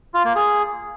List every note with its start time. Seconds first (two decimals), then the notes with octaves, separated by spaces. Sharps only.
0.14 F4
0.25 A#3
0.36 G#4